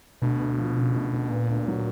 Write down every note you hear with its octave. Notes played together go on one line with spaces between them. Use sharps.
D2 B2
D2
F3
C#3
D2
D2
A#2 B3
D2
F#3